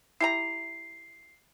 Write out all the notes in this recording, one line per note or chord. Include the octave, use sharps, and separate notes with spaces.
E4 G4 A#5 C7